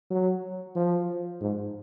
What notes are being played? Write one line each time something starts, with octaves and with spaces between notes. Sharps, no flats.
F#3
F3
G#2